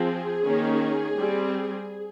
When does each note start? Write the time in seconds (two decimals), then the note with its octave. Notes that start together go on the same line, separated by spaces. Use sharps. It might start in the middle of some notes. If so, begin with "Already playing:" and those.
Already playing: F3 C4 G#4
0.44 D#3 A#3 C#4
1.16 G3 C4